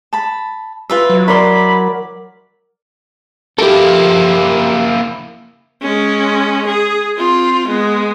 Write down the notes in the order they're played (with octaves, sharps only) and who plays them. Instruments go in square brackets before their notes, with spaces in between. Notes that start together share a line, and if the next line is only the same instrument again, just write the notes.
[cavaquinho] A5 B5
F4 B4 E5
[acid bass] F#3
[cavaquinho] E4 C6 [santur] A#4 D5 [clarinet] B5
[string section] F3 F4 [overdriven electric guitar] A#3 E4 [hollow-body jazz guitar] G4 A4
[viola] G#3 C#4
G#4
C4 F4
G#3 B3